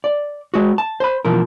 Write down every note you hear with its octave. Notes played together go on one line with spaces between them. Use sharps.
D5
G#3 F#4
A5
C5 B5
B2 E3 F3 A#4